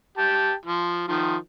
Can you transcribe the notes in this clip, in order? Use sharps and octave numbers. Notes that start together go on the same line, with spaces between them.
G4 A5
F3
D#3 F3